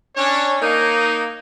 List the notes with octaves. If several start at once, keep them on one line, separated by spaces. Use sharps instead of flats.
C#4 D4 C#5
A#3 D#4